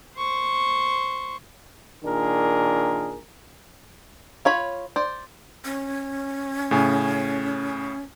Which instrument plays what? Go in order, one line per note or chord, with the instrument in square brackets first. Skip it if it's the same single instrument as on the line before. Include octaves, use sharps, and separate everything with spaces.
[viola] C5 C#6
[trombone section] A#2 D#3 D4 G#4 A#4
[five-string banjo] F4 C#5 B5
C5 D5
[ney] C#4
[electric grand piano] A2 C#3 G#5